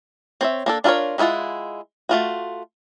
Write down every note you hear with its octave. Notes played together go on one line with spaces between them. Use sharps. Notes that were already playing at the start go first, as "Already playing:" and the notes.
C4 C#5 E5
A#3 D4 A4
D4 F4 A4 A#4 C#5
D#3 G#3 E4 F4 F#5
A3 F4 F#4